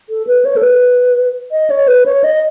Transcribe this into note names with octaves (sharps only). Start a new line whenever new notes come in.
A4
B4
C#5
A4
B4
D#5
C#5
B4
C#5
D#5